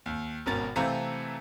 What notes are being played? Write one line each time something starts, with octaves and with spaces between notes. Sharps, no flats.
D#2
G#1 B2 C#4 A#4 A6
C3 E3 A3 C4 F5 A#5